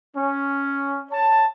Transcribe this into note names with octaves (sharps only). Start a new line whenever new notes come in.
C#4
C#5 A5